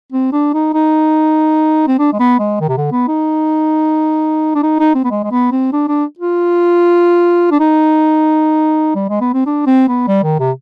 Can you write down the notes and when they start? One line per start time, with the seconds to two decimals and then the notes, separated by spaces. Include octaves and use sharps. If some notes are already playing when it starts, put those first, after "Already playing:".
0.12 C4
0.33 D4
0.54 D#4
0.74 D#4
1.88 C4
1.99 D4
2.13 G#3
2.19 B3
2.40 G#3
2.61 D#3
2.69 C3
2.77 D3
2.91 B3
3.08 D#4
4.55 D4
4.63 D#4
4.79 D#4
4.95 C4
5.04 B3
5.11 G#3
5.24 G#3
5.31 B3
5.52 C4
5.73 D4
5.88 D4
6.19 F4
7.51 D4
7.60 D#4
8.95 G3
9.09 G#3
9.21 B3
9.34 C4
9.46 D4
9.66 C4
9.88 B3
10.08 G3
10.24 D#3
10.40 C3